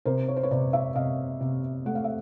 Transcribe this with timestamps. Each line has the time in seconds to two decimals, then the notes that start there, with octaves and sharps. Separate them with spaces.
0.05 C3 A#4 C5
0.28 C#5
0.36 C5
0.43 B4 C#5
0.51 C3 C5 D5
0.73 D5 E5
0.95 C3 D#5 F5
1.41 C3
1.86 A3 F#5
1.95 F5
2.04 E5